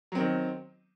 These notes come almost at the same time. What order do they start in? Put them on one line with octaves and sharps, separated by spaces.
F#3 C4 D#3